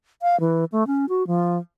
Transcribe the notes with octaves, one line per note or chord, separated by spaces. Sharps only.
F5
E3
A3
C#4
F#4
F3